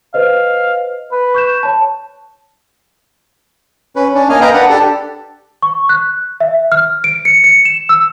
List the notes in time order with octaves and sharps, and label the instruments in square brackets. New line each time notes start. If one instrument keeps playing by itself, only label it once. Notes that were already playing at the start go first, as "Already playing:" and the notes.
[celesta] B4 C5 D#5 [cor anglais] F5
[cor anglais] B4
[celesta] C#6 G6 E7
C#5 A5
[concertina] C#4 B4
C#4 D4
A#3 D#5 F5 G#5
A#4 B4 D#5 F5 G5 A#5
D4 B4 F#5
D4 G4 A4
[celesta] C#6
F#6
E5
F6
D7
C#7
C#7
E7
E6